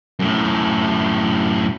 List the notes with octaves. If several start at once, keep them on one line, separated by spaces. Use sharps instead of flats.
F#2 A2